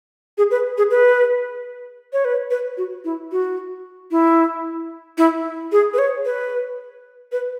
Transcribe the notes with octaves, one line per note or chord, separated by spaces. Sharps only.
G#4
B4
G#4
B4
C#5
B4
B4
F#4
E4
F#4
E4
E4
G#4
B4
C#5
B4
B4